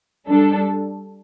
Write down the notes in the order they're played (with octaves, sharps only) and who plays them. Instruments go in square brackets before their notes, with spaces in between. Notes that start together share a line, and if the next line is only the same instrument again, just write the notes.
[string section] G3 D4 A4